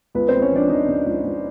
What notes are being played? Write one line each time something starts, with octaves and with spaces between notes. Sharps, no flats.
C#2 B3 B4
C4 C5
C#2
C#4 C#5
F3 D4 D5
F3 D#4 D#5
C#3
C#2
C#2